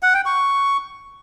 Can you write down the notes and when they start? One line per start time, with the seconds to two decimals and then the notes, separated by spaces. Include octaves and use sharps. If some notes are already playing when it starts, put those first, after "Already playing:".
0.03 F#5
0.14 G5
0.26 C#6